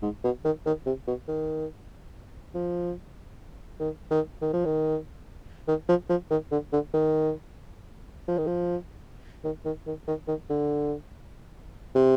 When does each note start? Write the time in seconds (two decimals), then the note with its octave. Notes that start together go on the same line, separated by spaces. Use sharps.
0.02 G#2
0.24 B2
0.45 D#3
0.66 D#3
0.86 C3
1.07 B2
1.28 D#3
2.55 F3
3.80 D#3
4.11 D#3
4.42 D#3
4.53 F3
4.65 D#3
5.68 D#3
5.89 F3
6.09 F3
6.31 D#3
6.51 D3
6.73 D3
6.94 D#3
8.28 F3
8.38 D#3
8.47 F3
9.44 D#3
9.65 D#3
9.87 D#3
10.07 D#3
10.28 D#3
10.50 D3
11.95 C3